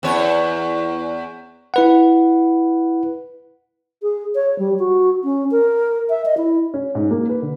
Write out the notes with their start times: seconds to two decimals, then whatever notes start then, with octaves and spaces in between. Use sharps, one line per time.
0.03 E2 C#5
1.74 E4 B4 F#5
4.03 G#4
4.35 C#5
4.59 G3
4.79 F#4
5.24 C#4
5.51 A#4
6.09 E5
6.25 D#5
6.37 E4
6.74 C#4
6.95 G#2
7.11 A#3
7.29 B4
7.42 D3